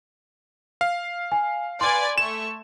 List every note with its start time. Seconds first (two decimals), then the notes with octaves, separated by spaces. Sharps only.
0.81 F5
1.32 G#5
1.81 B4 D5 G#5 C6 G#6
2.18 A3 C#6 E7